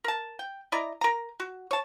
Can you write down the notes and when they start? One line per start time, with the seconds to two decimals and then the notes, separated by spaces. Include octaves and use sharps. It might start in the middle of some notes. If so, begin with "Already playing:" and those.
0.04 A#4 A5
0.39 G5
0.72 E4 D5 D#5 A#5
1.01 A#4 A#5
1.40 F#4
1.71 C#5 A5